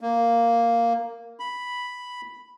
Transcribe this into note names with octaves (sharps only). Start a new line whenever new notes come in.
A#3
B5